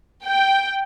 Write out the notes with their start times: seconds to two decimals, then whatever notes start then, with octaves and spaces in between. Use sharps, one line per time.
0.24 G5